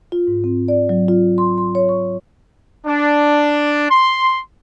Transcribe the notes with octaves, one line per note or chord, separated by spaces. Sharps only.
F4
G#2
C4
D5
F#3
F4
C6
C6
C#5
C#6
D4
C6